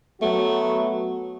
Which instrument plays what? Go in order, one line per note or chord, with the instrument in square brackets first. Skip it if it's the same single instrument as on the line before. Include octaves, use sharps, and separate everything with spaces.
[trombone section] F#3 B3 F#4 [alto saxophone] A3